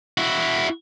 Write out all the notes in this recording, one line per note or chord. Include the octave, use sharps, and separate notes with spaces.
E4 F#4